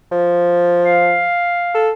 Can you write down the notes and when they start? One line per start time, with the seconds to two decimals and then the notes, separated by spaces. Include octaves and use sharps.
0.12 F3
0.84 F5
1.75 A4